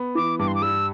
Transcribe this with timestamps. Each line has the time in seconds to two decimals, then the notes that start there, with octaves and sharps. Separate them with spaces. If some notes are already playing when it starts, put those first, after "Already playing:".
Already playing: B3
0.15 E3 D6
0.39 G2 D6
0.48 C6
0.55 D6
0.62 G3 E6